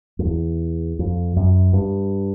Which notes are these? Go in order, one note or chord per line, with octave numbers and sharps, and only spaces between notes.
F2
E2
F2
F#2
G2